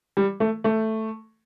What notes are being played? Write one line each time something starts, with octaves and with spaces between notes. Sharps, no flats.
G3
A3
A3